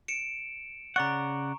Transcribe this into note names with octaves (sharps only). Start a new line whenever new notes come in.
C#7 D7 E7
C#3 D5 F#5 A#5 C#6